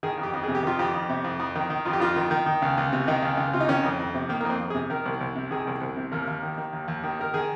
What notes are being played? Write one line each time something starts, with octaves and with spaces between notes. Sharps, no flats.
D#3 G#4
F2
G4
F2
C3 G#4
G4
D#3 F4
F2 G4
F2
C3
F2
F2
D#3
D#3
F2 F4
G4
F2 F4
D#3
D#3
D#3
C#2
C#2
C3
D#3 D#4
C#2
C#2
C3 F4
D#4
D#3 C#4
F2
F2
C3
D#3 A#3
A#3
F2 C4
F2
G#4
C3
D#3 A#4
C2
C2
C3
D#3 G#4
C2
C2
C3
D#2 A#4
D#2
D#3
D#3
D#2
D#2
D#3
D#3 A#4
D#3 G#4